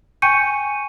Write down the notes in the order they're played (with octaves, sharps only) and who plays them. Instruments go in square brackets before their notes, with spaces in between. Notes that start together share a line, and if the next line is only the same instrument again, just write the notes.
[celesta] G5 G#5 C#6 G6 C#7 D#7